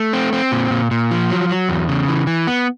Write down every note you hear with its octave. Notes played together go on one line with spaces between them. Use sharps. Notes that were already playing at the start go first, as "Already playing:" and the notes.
Already playing: A3
C4
C4
A#2
A#2
A#2
F3
F#3
F#3
E2
C#3
E3
E3
B3